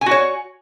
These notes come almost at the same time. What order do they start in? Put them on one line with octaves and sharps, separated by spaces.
G#5 F#4 C#5